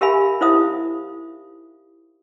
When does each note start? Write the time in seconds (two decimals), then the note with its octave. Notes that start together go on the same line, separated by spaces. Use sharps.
0.01 G4 A#4 E5 F5 G#5 B5
0.41 D#4 E4 C5 E5 F5 D#6